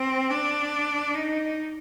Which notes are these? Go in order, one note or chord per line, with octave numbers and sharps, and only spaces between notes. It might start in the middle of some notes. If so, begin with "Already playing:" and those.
Already playing: C4
D4
D#4